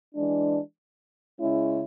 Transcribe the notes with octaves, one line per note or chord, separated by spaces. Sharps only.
E3 G#3 D4
C#3 G#3 C#4 E4